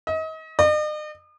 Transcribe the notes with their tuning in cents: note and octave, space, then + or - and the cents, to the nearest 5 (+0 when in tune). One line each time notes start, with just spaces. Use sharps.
D#5 +35
D#5 -45